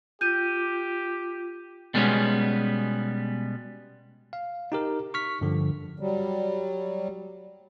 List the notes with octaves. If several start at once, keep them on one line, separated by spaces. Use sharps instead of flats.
F4 G4 G6 D#7
B2 G3 G#3 B3 C#4
F5
D#4 G4 A#4
C#6 F6 B6
G2 D3 F3
F#3 G3